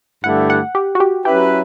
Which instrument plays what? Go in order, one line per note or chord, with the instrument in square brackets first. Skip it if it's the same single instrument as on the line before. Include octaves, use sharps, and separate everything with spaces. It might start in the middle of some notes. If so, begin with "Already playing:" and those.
[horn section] G2 D3 A3 E4 G4 [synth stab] F#5
[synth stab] F#5
G4
F#4
G4
[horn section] F#3 C#4 E4 B4 [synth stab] G4